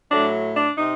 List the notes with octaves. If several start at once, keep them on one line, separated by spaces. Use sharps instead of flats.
A2 F#3 A3 D4
D4
C3 D#4